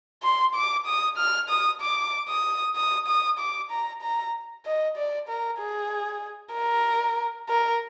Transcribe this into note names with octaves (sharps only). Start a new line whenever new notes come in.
C6
D6
D#6
F6
D#6
D6
D#6
D#6
D#6
D6
A#5
A#5
D#5
D5
A#4
G#4
A#4
A#4